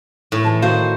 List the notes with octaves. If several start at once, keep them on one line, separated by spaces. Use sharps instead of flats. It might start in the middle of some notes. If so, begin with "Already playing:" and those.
A2
E3 A5
D#3 F#4 C5 F5